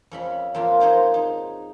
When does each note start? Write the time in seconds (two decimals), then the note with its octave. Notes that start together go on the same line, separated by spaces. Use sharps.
0.11 F2 C#4 B5
0.54 F2 A#3 F4
0.80 G#3 D#4 C5 C#5
1.14 D#4